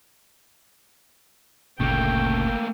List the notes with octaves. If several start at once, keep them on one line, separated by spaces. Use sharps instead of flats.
G1 D2 A#2 C#3 A3 A#3 G5